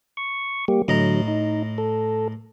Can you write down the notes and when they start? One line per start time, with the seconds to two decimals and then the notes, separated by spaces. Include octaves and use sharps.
0.17 C#6
0.68 G3 A#3 G4
0.88 A2 D3 F#3 D#5 A#5
1.28 D#4
1.78 A4